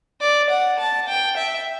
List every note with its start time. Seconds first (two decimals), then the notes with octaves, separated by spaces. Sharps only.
0.21 D5
0.50 F#5
0.79 A5
1.08 G5
1.37 E5